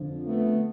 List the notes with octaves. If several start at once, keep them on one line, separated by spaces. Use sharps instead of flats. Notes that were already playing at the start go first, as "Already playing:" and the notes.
Already playing: F2 D3 F3
A3 B3